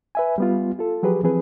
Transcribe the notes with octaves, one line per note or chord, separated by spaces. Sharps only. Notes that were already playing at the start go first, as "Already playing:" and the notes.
B4 E5 G#5
G3 B3 F4
F4 A4
F3 F#3 G4 G#4 B4
E3 F3 C4 G#4 B4